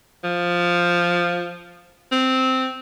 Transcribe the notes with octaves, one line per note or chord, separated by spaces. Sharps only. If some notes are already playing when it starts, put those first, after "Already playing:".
F3
C4